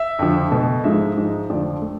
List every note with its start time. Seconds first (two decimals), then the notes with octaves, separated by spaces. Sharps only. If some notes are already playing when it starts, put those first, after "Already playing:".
Already playing: E5
0.19 F2 D3 F3
0.52 B2 A3
0.84 G#2 F3 G#3 E5
1.17 G#2 F3 G#3
1.49 F2 D3 F3 A3 D5
1.82 A3